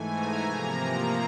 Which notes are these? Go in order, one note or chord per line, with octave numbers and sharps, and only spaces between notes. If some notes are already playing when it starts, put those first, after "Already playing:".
Already playing: G#2 E3 A3 G#5
A#5
C3 F3 A#3